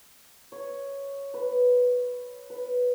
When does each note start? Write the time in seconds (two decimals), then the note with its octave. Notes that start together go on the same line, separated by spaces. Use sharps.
0.52 C#5
1.34 B4
2.50 B4